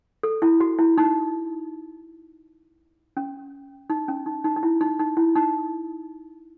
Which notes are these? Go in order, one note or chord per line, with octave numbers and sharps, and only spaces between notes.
A4
E4
F#4
E4
D#4
C#4
D#4
C#4
D#4
D#4
D#4
E4
D#4
D#4
E4
D#4